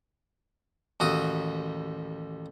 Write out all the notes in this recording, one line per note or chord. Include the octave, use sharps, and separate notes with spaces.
A1 D#2 F#4 D#6